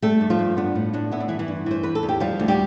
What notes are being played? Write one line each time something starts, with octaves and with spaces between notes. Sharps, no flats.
G3 A3 A4
G2
F3 F4
G2
B3 D4
A2
A2 D4
B3 E4
D4
G2 E3 E4
E3 E4
G2
E3 C5
E2 B4
A4
E2
G4
F3 G3 F4
D2
G3 G4